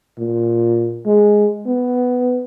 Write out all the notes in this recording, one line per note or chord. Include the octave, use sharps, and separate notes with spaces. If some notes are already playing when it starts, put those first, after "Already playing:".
A#2
G#3
B3